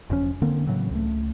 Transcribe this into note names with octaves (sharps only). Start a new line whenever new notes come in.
F#1 F2 C#3 C#4
D3 A#3 C4
A2 C#3 E3 F#3
C#2 A3